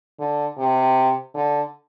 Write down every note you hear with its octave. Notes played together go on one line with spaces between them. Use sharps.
D3
C3
D3